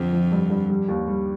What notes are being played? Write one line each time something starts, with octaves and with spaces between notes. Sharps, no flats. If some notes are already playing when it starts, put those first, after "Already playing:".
Already playing: F2 D3 F3
F3
G2
G2
G3
D#2
G3